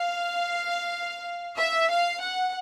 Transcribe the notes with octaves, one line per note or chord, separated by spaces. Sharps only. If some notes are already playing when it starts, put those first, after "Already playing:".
Already playing: F5
E5
F5
F#5